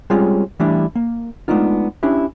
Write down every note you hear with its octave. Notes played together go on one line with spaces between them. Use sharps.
G3 G#3 C4 C#4 F4 G#4
E3 G3 A3 D4 E4
A#3
G#3 A3 B3 D4 D#4 F4
C#4 D4 E4 G4